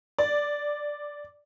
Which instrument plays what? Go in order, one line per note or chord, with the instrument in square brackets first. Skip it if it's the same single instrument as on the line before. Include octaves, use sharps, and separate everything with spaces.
[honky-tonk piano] D5